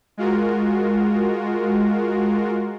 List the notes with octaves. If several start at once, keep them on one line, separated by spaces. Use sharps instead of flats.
G#3 F4 F#4 A#4